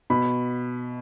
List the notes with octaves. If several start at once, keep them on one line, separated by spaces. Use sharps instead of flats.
B2 B5